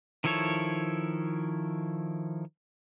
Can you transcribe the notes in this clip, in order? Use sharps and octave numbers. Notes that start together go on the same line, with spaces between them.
D#3 F3 E4 A4 C#5